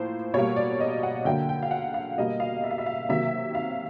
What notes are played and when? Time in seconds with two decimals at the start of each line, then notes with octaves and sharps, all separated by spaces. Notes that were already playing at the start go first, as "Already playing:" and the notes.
Already playing: A2 F3 A#3 C5
0.34 B2 G3 A#3 C#5
0.56 D5
0.80 D#5
1.03 F#5
1.25 D3 F#3 A#3 G5
1.49 G5
1.62 F5
1.71 F#5
1.94 F5
2.17 B2 G3 A#3 D#5
2.40 F5
2.64 E5
2.71 F5
2.78 E5
2.86 F5
3.09 C3 D#3 F#3 A#3 E5
3.55 F5